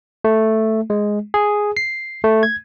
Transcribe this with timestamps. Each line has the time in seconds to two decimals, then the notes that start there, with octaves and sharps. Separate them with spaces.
0.24 A3
0.90 G#3
1.34 G#4
1.77 C7
2.24 A3
2.43 G#6